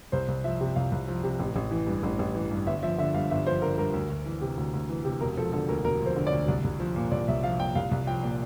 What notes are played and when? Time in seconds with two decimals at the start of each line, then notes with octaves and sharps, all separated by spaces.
0.12 C2 C5
0.28 C2
0.44 F3 E5
0.61 C3
0.76 C2 F5
0.92 C2
1.08 F3
1.24 C3
1.40 A1
1.56 A1
1.71 E3
1.87 G2
2.03 A1
2.19 A1
2.35 E3
2.51 G2
2.66 G1 E5
2.83 F3 E5
2.98 D3 E5
3.14 G2 F5
3.30 G1 E5
3.46 F3 C5
3.62 D3 A#4
3.78 G2 A#4
3.93 D2
4.10 D2
4.26 E3
4.41 C3
4.57 D2
4.73 D2
4.89 E3
5.05 C3
5.21 E1 A#4
5.37 F3 A4
5.53 D3 A4
5.68 D2 A#4
5.84 E1 A#4
6.01 F3
6.06 C5
6.16 D3
6.27 D5
6.32 D2
6.48 C2
6.64 C2
6.80 F3
6.96 A#2
7.11 C2 D5
7.28 C2 E5
7.43 F3 F5
7.60 A#2 G5
7.75 C2 F5
7.91 C2
8.07 F3 G5
8.23 A#2